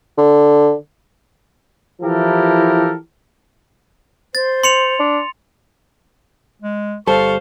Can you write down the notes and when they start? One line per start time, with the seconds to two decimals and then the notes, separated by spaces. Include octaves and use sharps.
0.17 D3
2.02 E3 F3 E4 G4 A4 A#4
4.35 C5 A6
4.63 C6 C#7 F7
5.00 D4
6.62 G#3
7.07 G1 G3 A4 C5 F5 C#6